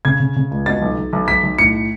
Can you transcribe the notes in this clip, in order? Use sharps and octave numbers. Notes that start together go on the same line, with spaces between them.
C#3 G#6
C#3
C#3
C#2
B2 A6
B1
B1
B1
B1 B6
B1
A2 C#7